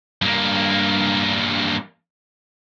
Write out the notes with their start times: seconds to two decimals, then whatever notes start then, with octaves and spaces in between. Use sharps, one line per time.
0.22 G2 A#3